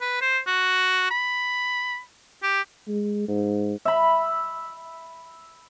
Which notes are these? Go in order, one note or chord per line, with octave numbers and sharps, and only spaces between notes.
B4
C5
F#4
B5
G4
G#3
G#2
E5 B5